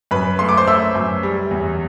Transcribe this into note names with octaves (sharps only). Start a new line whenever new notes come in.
F#2 B4 B5
A3 C6
D6
C5 C6
A3 E5 E6
F#2
G3
E2